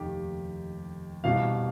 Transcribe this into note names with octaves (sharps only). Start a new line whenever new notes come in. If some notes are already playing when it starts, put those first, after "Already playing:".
Already playing: F1 D#2 D#3 G4
C2 B2 F5